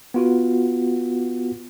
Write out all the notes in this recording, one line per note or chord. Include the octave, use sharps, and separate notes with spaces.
B3 F4 F#4